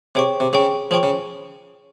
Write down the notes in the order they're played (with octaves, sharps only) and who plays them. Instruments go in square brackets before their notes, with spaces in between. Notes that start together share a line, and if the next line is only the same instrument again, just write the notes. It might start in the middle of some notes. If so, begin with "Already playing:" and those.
[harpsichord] C3 [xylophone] G#4 C#5 G5 C#6
[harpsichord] C3
[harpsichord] C#3 [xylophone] G#4 C#5 G5 C#6
[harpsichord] F3 [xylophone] G#4 C#5 G5 C#6
[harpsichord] C#3